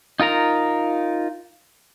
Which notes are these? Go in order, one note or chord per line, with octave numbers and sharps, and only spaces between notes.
D#4 F4 A#4 A#5